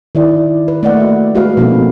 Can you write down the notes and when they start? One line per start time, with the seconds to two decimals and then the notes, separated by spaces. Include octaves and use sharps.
0.15 D#3 E4 D5
0.68 B4
0.83 A3 A#3 D5 D#5 F#5
0.96 F#4 E5
1.35 G#3 F#4 G#4 B4 F5
1.57 B2 F3 A#3 C4 D#4 A4